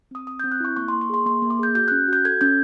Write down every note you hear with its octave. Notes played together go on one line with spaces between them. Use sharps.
C4 D#6
C4 D#6
G6
C4
F#6
E4 C#6
A#3 C#6
C6
A#3
C#6
G#4 C6
A#3 C6
A#3
D6
G#4 G6
F#4 G6
F#6
C#4
F#4 G6
A4 G#6
C#4 G6